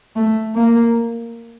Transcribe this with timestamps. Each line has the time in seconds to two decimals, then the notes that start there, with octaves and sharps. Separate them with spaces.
0.16 A3
0.55 A#3